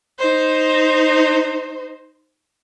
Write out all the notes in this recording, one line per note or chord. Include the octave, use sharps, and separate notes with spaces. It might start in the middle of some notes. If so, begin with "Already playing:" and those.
D#4 C5